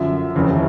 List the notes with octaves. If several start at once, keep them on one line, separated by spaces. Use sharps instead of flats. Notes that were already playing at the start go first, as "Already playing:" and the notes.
Already playing: F#2 D3 F3 E5
F1 D#2 C#3 E3